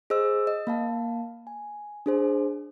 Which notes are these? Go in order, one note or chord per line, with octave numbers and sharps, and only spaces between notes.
G#4 C5 D#5 E6
D#5
A#3 F5 A5
G#5
D4 G#4 C5